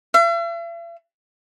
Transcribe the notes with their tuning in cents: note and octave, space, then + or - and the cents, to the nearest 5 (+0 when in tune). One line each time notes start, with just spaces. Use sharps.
E5 +45